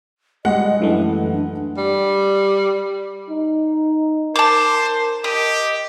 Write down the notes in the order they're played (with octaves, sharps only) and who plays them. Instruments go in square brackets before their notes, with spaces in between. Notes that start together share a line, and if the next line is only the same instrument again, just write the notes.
[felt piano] G3 G#3 [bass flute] D#5 [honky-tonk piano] F#5
[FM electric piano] F#2 E3 A3 [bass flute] D4
[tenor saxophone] G3
[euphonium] D#4
[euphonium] A#4 [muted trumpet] C5 [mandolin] A5 D6
[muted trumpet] G4 [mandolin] D#5